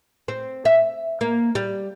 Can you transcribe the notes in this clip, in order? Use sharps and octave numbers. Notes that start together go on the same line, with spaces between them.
C4
E5
A#3
G3